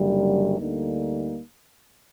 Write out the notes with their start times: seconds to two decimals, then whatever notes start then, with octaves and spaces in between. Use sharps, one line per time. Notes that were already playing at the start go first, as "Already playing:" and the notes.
Already playing: F#1 F#2 D3 G3
0.58 D2 D3 G3 A#3 D#4